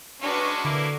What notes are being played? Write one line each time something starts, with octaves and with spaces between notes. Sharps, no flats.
G#3 C#4 D4 F#4 B4
D3 A#3 E4